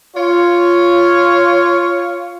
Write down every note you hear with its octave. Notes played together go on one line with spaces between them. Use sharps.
F4 C#5